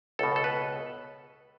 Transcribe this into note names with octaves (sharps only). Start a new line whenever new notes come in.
C#2 B2 A4
A4
B4